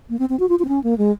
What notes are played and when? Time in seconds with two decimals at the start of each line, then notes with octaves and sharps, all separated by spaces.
0.10 A#3
0.19 C4
0.29 C4
0.40 F#4
0.49 F4
0.59 F4
0.65 C4
0.69 C#4
0.84 A#3
0.98 G#3